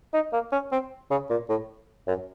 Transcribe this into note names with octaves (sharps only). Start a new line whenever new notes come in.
D#4
A#3
C#4
C4
C#3
A#2
A2
F#2